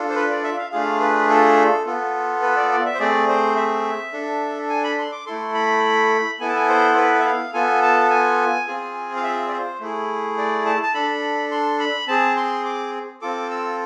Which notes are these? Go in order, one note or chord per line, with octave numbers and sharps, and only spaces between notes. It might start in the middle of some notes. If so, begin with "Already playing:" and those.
Already playing: D4 F4 A4
C5
B4
D5
E5
F5
A3 D4 F4 G#4 F5
B4
A4
B3 F4 A4
B4
D5
D5
E5
C5
A3 C4 G#4 D5
C5
E5
D4 A4
G#5
B5
C6
D6
A3 E4 A4 C6
B5
B3 E4 A4 G#5
A5
G#5
C5
B4
E5
F5
B3 F4 A4 G#5
A5
G#5
C4 F4 G#4
F5
E5
D5
C5
A3 E4 G#4
D5
A5
A5
D4 A4 B5
C6
B5
C4 G#4 A5
C6
D6
C4 F4 A4 D6
E6